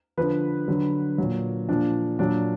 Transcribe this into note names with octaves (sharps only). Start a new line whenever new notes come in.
D3 F3 B4
D3 F#3
A#2 F#3
A#2 F3 D4
A#2 F#3 D4